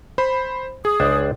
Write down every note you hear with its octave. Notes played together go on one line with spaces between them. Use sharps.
C5 B5
G#4 D#6
C#2 D4 C5